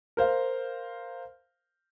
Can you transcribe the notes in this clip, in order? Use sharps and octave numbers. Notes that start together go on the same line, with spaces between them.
A#4 C5 F5